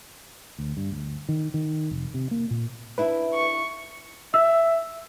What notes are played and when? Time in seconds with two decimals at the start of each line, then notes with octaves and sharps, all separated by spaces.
0.58 D2
0.77 G2
0.91 D2
1.29 D#3
1.54 D#3
1.91 F1
2.14 C3
2.31 A#3
2.51 A#2
2.98 D4 E4 B4 E5
3.34 C#6
4.34 E5 E6